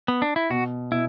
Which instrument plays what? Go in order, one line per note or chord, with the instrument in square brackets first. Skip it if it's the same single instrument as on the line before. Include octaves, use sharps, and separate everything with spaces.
[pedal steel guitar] B3
D4
E4
[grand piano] B2 [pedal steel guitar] F#4
[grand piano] B2 [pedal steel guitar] E4